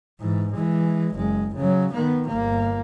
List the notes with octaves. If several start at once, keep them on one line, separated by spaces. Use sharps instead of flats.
G#2 E3
E3 G#3
F#1 G#3
C#3 F#3
D#3 B3
G1 A#3